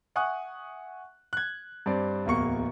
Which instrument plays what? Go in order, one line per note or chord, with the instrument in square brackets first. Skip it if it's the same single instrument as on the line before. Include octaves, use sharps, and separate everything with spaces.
[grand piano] E5 F#5 G#5 C#6 D#6 F#6
F#6 G#6
G2 C4 D5
D1 E2 A#3 C#6 C#7